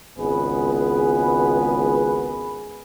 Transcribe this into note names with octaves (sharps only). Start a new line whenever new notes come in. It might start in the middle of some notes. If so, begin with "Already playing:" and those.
G#1 C#2 G#3 B3 G#4 B4